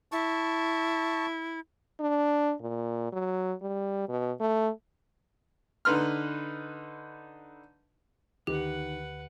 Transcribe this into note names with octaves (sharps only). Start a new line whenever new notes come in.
E4 A5 C#6
D4
A#2
F#3
G3
B2
A3
D3 D#4 B4 C6 F6
D2 D#3 G4 B4 F#5